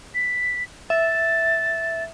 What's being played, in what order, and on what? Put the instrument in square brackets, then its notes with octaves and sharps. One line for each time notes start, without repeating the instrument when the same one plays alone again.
[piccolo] B6
[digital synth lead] E5 [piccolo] A6